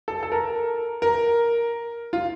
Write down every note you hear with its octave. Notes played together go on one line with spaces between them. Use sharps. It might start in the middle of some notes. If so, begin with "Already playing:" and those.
A4
A4
A#4
A#4
F4